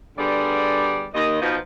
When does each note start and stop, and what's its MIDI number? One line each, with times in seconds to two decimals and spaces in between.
0.18 1.07 50
0.18 1.07 55
0.18 1.07 59
0.18 1.07 68
0.18 1.07 74
1.15 1.39 39
1.15 1.39 75
1.41 1.58 47
1.41 1.58 53
1.41 1.58 59
1.41 1.58 63
1.41 1.58 65